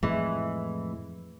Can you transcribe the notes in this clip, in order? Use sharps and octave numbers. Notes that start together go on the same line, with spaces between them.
F2 A2 E3 G#3